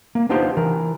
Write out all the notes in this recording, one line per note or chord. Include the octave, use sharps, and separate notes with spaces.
A#3
B3 D4 D#4 F4 G4 C5
E3 A#4